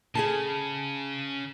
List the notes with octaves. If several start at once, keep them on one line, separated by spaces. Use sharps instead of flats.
C#3 G#4 G#5 A5